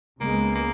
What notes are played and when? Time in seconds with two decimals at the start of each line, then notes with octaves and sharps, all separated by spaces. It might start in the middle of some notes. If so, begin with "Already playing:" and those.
0.20 C#2 C#3 G#3 A#3 B3
0.55 A#3